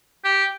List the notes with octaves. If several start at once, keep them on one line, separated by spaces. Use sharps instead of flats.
G4